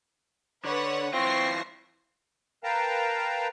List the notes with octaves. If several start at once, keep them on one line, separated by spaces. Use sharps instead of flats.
D3 B4 C#5 F#5
E3 C4 F4 C#6 A#6 C7
A#4 B4 F5 G5 A5 A#5